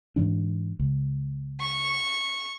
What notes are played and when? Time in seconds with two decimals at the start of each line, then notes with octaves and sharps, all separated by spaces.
0.16 G#2 E3 D4
0.79 C#2
1.60 C#6